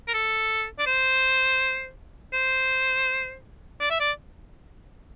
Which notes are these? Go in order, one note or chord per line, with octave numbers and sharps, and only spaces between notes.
A#4
A4
D5
C5
C5
D5
E5
D5